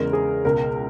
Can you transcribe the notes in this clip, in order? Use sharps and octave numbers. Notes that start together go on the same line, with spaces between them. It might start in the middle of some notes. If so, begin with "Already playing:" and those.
Already playing: E2 C#3 G#3 A#4
G#4
C#2 B2 G#3 A#4